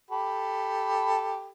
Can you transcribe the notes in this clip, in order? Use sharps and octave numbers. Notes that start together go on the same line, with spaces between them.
G4 A4 B5